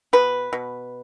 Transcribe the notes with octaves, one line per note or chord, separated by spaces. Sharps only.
B2 B4
B2